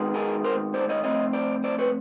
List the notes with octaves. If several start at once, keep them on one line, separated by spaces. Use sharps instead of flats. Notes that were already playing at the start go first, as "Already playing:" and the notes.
Already playing: D#3 G#3 B3
G#4 A#4
A#4 C5
C5 D5
C#5 D#5
F3 A3 C4 C#5 D#5
C5 D5
C5 D5
B4 C#5